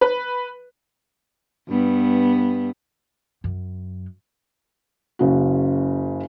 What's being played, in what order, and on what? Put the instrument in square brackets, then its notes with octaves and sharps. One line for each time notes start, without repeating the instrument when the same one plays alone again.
[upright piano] B4
[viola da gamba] G2 B3
[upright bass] F#2
[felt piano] F#1 C#3 F#4